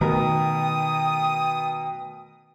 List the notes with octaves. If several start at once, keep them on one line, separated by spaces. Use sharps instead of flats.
B2 D#3 A3 B3 A#4 G5 D#6